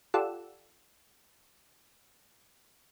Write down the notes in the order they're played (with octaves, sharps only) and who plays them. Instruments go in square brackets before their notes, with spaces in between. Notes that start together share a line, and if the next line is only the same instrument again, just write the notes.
[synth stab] F4 G4 A4 D5 F#5 E6